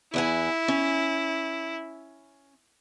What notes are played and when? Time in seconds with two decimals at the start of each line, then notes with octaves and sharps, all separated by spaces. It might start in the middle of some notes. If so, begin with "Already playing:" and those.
0.14 E2 E4 F#5 G#5
0.68 C#4